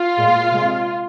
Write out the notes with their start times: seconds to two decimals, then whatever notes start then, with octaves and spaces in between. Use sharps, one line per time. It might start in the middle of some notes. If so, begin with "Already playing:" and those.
Already playing: F4
0.18 A#2 G#3
0.52 C3 G#3